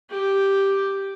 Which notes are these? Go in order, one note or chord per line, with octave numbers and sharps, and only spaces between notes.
G4